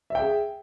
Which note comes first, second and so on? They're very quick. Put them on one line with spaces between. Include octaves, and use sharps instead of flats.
E5 G5 G#4